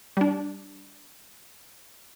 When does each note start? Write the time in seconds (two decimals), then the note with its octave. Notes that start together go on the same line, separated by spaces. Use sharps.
0.17 G3 D4